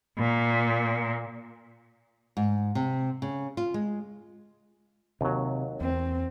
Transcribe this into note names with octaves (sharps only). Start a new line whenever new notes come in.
A#2
G#2
C3
C#3
F4
G#3
D#2 C3 F#3 C4
E2 C4